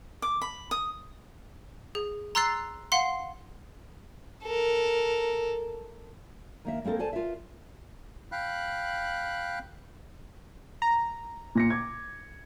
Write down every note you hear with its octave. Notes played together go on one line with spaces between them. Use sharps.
D6
B5
D#6
G#4
A#5 C6 E6 F#6 A6 C7
F5 F#5 C6
A4 A#4
D#3 A#3 E5
G#3 A#3 C4 A4 A#4
A4 C5 D5 G#5 A5
F4 A#4 B4 E5
F5 G5 B5 F#6
A#5
A#2 A#6 C#7
D6 G#6